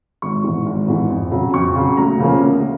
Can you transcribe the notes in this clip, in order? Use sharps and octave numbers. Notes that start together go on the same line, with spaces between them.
G#1 C#6
G#2 E3
G#1
G#2 E3
F2
C#3 F#3
F2 C#6
C#3 F#3
D2 A#5
C#3 F3 A#3 C#4
D2